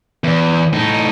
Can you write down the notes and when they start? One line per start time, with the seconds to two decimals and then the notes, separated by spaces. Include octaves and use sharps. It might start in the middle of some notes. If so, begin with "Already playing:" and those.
0.24 E2
0.73 A2 D#4